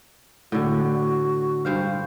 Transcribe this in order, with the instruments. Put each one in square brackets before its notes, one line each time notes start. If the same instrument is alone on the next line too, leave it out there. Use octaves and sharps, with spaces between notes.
[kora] A2 D3 [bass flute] F#4
[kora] G2 C5 F5